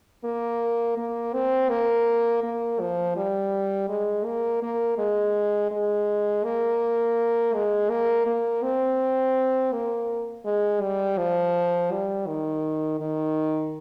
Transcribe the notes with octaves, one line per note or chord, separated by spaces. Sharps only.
A#3
A#3
C4
A#3
A#3
F3
G3
G#3
A#3
A#3
G#3
G#3
A#3
G#3
A#3
A#3
C4
A#3
G#3
G3
F3
G3
D#3
D#3